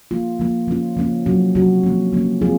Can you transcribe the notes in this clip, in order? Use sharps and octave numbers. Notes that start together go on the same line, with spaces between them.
F3 A#3 F4
F3 A#3 F4
F3 A#3 C#4 F4
F3 A#3 C#4 F4
C3 F#3 C#4 F#4
C3 F#3 C#4 F#4
F3 A#3 C#4
F3 A#3 C#4
F3 C4 F4 G#4